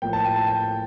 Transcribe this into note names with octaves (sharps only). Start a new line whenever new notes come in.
A2 F3 A#3 G5
A5
G5
A5
G5